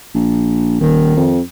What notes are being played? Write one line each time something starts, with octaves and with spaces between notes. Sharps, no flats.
A#1
D#1 D#3
F2